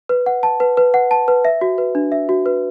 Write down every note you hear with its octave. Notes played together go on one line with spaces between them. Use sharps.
B4
F#5
A5
B4
B4
F#5
A5
B4
E5
F#4
B4
D4
E5
F#4
B4